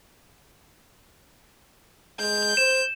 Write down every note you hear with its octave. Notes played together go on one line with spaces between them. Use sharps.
G#3 G6
C5 E7